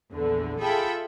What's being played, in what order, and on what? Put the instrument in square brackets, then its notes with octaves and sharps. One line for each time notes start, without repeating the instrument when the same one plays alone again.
[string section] A#1 E2 D3
F4 G#4 A4 E5 G5 B5